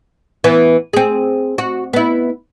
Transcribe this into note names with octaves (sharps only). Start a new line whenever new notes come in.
E3 B3
C4 G#4
F#4
B3 E4